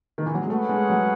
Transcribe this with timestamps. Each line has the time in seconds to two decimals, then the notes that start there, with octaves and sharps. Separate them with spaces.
0.18 D#3
0.26 E3
0.34 F#3
0.42 G#3
0.50 A3 C#4 G#4 B4 F#5
0.69 G#3
0.90 F#3